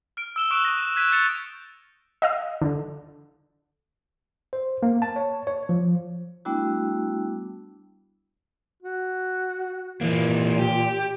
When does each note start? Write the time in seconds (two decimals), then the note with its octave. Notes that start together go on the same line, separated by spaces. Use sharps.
0.17 F6 D7
0.36 E6 E7 G7
0.51 C#6 D#6 E6 F#6 D7 E7
0.65 A#6 D#7
0.96 F#6 G#6 B6 D#7 E7
1.12 F6 G6 A6 C#7 D#7 F7
2.22 D#5 F5 E6
2.61 D3
4.53 C5
4.83 A#3
5.02 A5
5.16 C#5
5.47 C#5
5.69 F3
6.45 G3 A3 B3 D4 E4 F#4
8.82 F#4
10.01 A#2 E3 A#3
10.59 G4